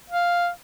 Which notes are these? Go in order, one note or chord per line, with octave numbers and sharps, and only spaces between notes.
F5